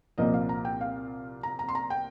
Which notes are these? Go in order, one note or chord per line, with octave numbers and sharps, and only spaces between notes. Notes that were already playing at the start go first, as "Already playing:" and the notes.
C2 A#2 F3 A#3 D#5
F5
A#5
G5
F5
A#5
A#5
C6
A#5
G5